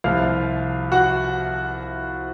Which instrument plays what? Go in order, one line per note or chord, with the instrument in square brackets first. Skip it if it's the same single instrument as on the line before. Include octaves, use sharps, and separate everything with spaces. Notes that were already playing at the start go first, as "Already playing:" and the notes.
[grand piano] C2 C3 F3 F4 F5
F#4 F#5